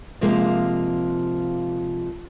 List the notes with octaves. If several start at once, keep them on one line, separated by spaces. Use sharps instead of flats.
C3 F3 G#3 A#3